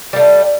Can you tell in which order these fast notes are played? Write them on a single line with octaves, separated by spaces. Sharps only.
G3 A#3 A3